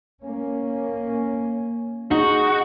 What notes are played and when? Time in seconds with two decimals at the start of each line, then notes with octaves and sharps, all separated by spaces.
0.20 A#3 C#4
2.11 D#4 F#4 G#4 C#6